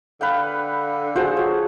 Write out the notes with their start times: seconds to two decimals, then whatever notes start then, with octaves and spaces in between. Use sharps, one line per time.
0.21 D3 B4 F5 G5
1.16 F4 F#4 G#4 C5 F#5 A5
1.37 C#5